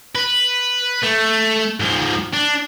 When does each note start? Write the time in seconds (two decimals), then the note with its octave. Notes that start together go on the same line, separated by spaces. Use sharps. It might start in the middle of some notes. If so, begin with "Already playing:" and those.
0.16 B4
1.03 A3
1.80 G#2 F3
2.34 D4